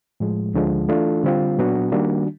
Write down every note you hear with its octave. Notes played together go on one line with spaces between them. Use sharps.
A2 F3 G#3
D2 D3 F3 G#3
E3 A3 D4 F4 A4
D3 G3 C4 F4
A#2 F#3 B3 D4 F#4
D#3 G3 A#3 D4 F#4